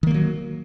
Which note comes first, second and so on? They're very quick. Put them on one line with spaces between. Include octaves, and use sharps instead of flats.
D#3 A#3 G3 F#3